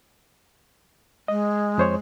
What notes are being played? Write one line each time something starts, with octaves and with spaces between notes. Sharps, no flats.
G#3 D#5
F2 C5 C#5